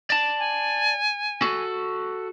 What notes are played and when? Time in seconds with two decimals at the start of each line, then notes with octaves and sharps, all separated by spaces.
0.10 D5 A5
0.39 G#5
1.42 F#4 A4